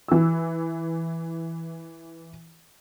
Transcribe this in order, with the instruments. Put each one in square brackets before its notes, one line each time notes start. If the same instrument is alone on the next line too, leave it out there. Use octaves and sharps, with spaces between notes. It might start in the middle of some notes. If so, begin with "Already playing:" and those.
[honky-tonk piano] E3 E6